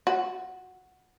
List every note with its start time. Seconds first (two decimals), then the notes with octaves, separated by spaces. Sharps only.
0.07 F#4